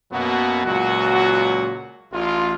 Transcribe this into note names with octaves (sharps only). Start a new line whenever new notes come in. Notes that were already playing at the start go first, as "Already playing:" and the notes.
F#2 B2 F#3 A#3 B3 F#4
C#2 A#2 F#3 F#4
A1 F4